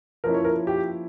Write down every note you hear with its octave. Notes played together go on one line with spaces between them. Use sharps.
F3 A#3 C#4 E4 A#4
C#5
A#4
G4